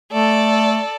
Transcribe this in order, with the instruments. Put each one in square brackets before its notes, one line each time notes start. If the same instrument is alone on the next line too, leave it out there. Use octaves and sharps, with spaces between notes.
[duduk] A3 [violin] A4 D5